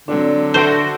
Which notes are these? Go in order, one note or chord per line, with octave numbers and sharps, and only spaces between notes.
D3 F#3 C4 D4
F#4 A4 C5 E5 C#6 D7